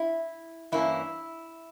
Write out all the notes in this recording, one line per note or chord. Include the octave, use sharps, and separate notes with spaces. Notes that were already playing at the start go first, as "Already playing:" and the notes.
Already playing: E4
G2 E3 A#3 C#4 E4